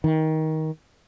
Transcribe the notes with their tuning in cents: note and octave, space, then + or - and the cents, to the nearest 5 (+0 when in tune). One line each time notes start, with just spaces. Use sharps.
D#3 +20